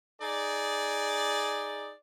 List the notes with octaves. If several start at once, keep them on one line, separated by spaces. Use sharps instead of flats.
D#4 G#4 D5